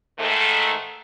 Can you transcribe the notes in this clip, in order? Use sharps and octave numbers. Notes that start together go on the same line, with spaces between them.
G#2 D#3 A3